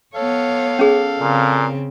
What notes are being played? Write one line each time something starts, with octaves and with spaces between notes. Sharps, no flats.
B3 A4 C#5 F5
C#4 G#4
A#2 C#3 C4